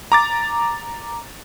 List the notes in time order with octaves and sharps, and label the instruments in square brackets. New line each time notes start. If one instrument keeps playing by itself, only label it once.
[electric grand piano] A#5 D6 A6